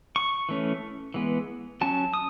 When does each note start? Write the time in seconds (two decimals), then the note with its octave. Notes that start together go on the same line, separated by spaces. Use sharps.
0.16 C#6
0.49 E3 A3 C#4
1.14 E3 G#3 B3
1.81 F#3 C#4 A5
2.14 D#6